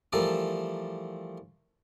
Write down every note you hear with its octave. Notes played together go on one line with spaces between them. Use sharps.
E3 F3 G3 A3 A4 A#4